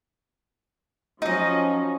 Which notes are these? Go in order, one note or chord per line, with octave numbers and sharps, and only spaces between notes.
F3 F#3 C#4 D#4 D#5